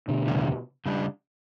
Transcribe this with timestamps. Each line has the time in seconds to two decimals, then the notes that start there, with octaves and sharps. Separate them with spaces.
0.08 B2 D3
0.28 E2 C#3 G3
0.86 C#3 G3 D4